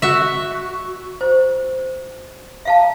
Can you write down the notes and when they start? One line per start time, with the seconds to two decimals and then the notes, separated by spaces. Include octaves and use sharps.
0.02 F#4 E5
1.21 C5
2.65 E5 F5 A5